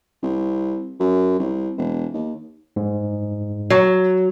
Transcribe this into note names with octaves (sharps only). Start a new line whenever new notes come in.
C2
F#2
C2
E1
D#2
G#2
F#3